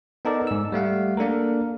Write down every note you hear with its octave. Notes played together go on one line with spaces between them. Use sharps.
B3 D#4 A4 A#4 D5
G#2 E6
G3 A3 F5 F#5
A#3 D4 A4 A#4